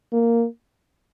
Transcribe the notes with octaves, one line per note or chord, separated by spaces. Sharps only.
A#3